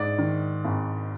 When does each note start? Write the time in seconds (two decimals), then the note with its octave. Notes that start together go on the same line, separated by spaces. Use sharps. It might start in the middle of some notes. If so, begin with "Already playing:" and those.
Already playing: G#2 D5
0.18 D#3
0.64 G#1